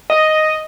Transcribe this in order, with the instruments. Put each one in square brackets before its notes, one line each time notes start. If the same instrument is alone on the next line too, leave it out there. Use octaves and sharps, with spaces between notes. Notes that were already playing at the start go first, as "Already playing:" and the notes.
[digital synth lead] D#5